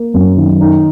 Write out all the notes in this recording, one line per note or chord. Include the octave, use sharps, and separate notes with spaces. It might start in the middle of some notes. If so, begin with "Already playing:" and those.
Already playing: A#3
F#2
D#3
D#4